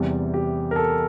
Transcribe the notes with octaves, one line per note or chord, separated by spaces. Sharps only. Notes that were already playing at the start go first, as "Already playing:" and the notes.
Already playing: E2 C3 E3 G3
G4
A#4
A4